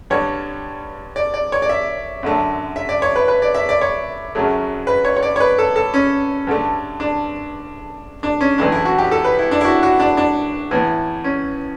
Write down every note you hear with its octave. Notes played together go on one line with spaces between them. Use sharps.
G2 D3 G3 C#5
D5
D5
C#5
D5
E5
F#2 D3 A3
E5
D5
C#5
B4
B4
D5
E5
D5
C#5
F#2 C#3 F#3 A3
B4
C#5
C#5
D5
C#5
B4
A4
A4
C#4
G2 D3 A3
D4
D4
C#4
B1 A2 E3 A3 D4
E4
F#4
G4
A4
B4
E4
D4
E4
F#4
F#4
D4
D4
A2 E3 B3
C#4